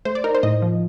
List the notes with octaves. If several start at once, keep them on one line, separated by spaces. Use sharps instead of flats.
A3 C5
D5
D#4 A#4
C5
A2 D#5
F3